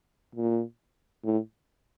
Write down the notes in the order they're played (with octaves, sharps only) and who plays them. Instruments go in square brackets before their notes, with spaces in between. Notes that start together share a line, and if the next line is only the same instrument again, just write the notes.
[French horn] A#2
A2